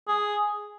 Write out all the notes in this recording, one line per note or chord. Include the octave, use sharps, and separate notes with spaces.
G#4